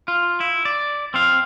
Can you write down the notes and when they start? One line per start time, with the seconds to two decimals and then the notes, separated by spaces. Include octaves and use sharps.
0.08 F4
0.40 E4
0.65 D5
1.14 C4 F5